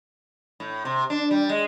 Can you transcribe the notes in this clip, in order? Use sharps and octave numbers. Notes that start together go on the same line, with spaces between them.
A2
C3
D4
G3
G#3